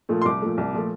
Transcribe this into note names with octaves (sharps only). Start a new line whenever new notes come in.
A#2 F3 A3
C6
C2 D6
A#2 F3 A3
C2
A#2 F3 A3